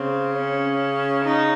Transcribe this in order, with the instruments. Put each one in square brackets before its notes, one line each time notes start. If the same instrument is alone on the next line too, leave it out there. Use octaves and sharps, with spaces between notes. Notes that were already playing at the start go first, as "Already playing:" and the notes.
Already playing: [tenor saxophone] C#3 [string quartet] C4
[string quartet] C#4
D#4